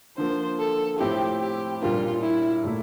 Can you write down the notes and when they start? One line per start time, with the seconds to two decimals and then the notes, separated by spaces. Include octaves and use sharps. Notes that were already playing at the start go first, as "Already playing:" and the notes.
0.17 D3 F3 A#3 C5
0.59 A4
0.99 A2 F3 C4 E4 G4
1.40 G4
1.81 A#2 G3 A#3 D4 F4
2.22 E4
2.64 A#2 A3 E4